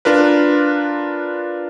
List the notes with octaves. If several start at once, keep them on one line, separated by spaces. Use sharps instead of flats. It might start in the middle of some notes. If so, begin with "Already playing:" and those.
D4 F4 A#4 B4